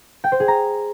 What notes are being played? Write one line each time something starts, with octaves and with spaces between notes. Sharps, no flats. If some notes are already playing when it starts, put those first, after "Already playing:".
G5
C5
G#4
A#5